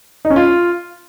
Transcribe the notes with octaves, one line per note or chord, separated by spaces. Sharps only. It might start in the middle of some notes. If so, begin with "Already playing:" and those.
D#4
C#4
F4